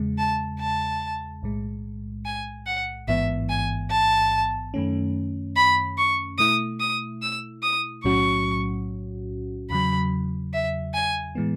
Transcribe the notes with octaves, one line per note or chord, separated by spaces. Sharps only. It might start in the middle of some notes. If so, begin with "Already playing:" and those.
Already playing: E2 C#3 G#3
A5
A5
B1 A2 G#3
G#5
F#5
A1 G#2 E3 B3 E5
G#5
A5
F#2 D#3 A3 C#4
B5
C#6
B2 A3 E4 D#6
D#6
E6
D#6
B1 A2 F#3 C#4 F#4 C#6
E2 C#3 F#3 B5
E5
G#5
A2 E3 G#3 B3